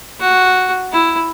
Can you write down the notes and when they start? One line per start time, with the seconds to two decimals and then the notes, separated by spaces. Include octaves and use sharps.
0.20 F#4
0.92 E4